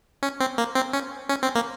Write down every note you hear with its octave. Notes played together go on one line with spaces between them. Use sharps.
C#4
C4
A#3
C4
C#4
C#4
C4
A#3